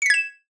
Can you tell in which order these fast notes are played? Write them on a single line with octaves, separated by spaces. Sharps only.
C#7 B6 G#6 E7